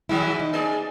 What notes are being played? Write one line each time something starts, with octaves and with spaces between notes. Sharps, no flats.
D#3 F#3 G#3 E4
D#4
A#3 G#4 D5